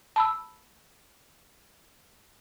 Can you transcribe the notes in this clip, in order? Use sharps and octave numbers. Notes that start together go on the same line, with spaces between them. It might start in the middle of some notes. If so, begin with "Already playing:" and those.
A5 B5 E6